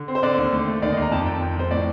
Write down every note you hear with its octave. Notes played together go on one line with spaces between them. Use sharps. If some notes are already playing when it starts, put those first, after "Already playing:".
Already playing: D3
C4
C5
D3 D5
D#2
A3
A3
D#2 D5
D#5
D#2
A#5
F2 A5
F2 G5
F2
F2 C5
A2 D5